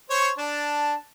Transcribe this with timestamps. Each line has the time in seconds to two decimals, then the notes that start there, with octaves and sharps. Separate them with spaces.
0.10 C5 C#5 C#6
0.38 D4 A5